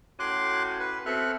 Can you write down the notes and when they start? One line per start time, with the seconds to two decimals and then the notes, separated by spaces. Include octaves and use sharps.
0.20 A2 C#4 F#4 C6 D6 F#6
0.79 B4
1.06 B2 C4 A4 E5 F6 F#6